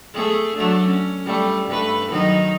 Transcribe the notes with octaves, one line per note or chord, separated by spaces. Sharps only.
A3 G#4
F#3 A3 D4
C#4
G3 A3
G2 A3 B4
D#3 F#3 D#4